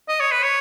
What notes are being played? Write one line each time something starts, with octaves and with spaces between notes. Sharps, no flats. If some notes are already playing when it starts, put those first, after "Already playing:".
D#5
C#5
B4
C#5